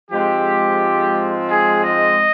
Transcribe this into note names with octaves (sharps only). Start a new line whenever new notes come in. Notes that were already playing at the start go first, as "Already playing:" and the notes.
G#2 F3 G#3 C4 G4
G#4
D#5